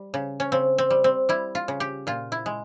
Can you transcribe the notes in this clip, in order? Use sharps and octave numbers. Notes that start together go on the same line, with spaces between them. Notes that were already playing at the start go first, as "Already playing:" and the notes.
Already playing: G3
C#3
C#4
C#3 C4
C4
G3
C4
G3 E4
F4
C#3
G4
A#2 F4
E4
G#3